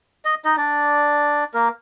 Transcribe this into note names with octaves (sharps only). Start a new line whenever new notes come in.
D#5
D#4 D#5
D4 D5
A#3 A#4